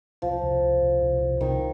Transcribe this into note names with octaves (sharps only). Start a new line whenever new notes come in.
C2 F3
C2
C2
C2
C2
C2
C2 D#3